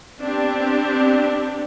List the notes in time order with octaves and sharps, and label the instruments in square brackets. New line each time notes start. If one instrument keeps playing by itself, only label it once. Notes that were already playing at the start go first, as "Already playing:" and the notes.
[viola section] B3 C4 D4 G4